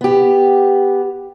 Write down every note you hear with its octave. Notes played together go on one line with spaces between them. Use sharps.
B3 G4